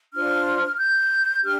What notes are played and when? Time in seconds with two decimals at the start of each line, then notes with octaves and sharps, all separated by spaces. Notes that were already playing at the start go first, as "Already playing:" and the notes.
0.13 D4 F4 C5 F6
0.79 G6
1.43 D4 G4 F6